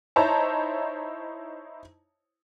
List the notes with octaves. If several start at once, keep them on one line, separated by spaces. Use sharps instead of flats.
D#4 E4 C5 C#5 A5 A#5